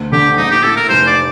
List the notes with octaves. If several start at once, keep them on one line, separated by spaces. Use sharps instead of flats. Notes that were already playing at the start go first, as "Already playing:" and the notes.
Already playing: D2
D3 G4
A#1 D#4
G4
A2 A4
A#4
F1 C5
D5